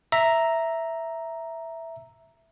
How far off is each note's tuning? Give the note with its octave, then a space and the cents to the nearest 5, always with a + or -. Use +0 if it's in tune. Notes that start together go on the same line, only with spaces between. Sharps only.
E5 +0 A#5 +0